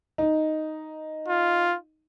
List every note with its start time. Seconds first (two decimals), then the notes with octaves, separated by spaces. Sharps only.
0.18 D#4
1.28 F4